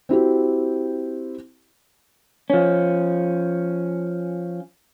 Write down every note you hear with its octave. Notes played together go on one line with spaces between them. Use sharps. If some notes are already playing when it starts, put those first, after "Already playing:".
C4 E4 F#4 G4
F3 C#4